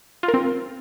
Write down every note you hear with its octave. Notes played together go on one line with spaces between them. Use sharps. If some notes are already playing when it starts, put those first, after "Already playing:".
F4
A#4
C4